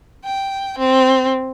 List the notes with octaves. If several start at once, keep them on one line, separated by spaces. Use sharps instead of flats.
G5
C4